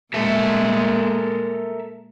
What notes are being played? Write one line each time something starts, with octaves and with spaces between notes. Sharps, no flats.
A#2 G#3 A4 A#4 E5